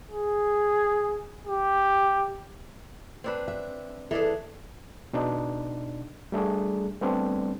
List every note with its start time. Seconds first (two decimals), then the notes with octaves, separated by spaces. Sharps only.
0.11 G#4
1.47 G4
3.24 C4 D4 B4
3.48 E5
4.11 E3 D4 G#4 A4
5.13 B2 D4 D#4
6.32 G3 A3 D4 G#4
7.01 G3 A3 B3 C4 D4